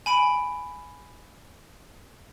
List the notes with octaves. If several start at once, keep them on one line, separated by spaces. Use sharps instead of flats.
G#5 B5 D7